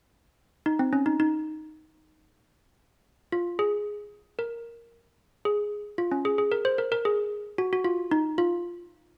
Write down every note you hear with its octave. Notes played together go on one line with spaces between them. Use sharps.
D#4
C4
C#4
D#4
D#4
F4
G#4
A#4
G#4
F4
C#4
G#4
G#4
A#4
C5
A#4
A#4
G#4
F#4
F#4
F4
D#4
F4